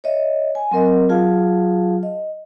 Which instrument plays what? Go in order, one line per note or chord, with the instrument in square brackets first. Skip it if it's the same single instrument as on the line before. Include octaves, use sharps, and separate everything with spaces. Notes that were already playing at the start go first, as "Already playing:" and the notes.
[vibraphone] C#5 D#5 E5
G#5
F#3 C4 A#4 D#5
F#3 F4 G#4 F5 A5
D#5